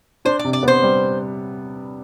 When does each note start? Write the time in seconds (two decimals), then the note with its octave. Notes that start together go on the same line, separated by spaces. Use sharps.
0.25 D4 C5
0.39 D5
0.45 C3
0.53 D5
0.63 B3 C5
0.83 G3